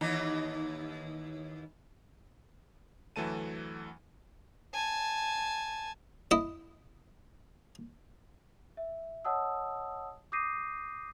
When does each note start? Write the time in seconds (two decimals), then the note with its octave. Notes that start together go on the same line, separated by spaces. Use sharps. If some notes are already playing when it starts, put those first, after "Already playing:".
0.01 D#2 E3 D#4
3.16 D2 E3 F#3 A3 A5 D#7
4.74 G#5 A5
6.31 E4 D#5
8.77 E5
9.25 C#5 D#5 F#5 A5 D#6 E6
10.32 D6 D#6 G6 A#6 C7 D#7